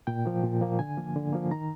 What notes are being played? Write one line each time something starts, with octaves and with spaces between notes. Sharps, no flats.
A#2 G5
F3 A#3
A#2
F3 A#3
D3 G#5
F3 A#3
D3
F3 A#3
D#3 A#5